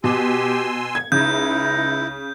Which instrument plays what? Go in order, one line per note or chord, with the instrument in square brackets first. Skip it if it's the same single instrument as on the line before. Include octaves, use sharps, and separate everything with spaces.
[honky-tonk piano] B2 [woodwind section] G4 [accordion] G#5 C6 E6
[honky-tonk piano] G#6
[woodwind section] C#2 G#3 D#4 [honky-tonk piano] C#3 [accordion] E4 [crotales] G6